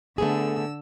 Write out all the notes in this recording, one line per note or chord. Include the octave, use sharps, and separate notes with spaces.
D3 A3 B3 G#4 E6